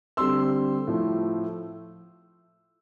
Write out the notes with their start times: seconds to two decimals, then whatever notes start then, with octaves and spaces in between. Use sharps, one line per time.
0.17 D3 G3 C4 C6 E6
0.87 A2 F3 A3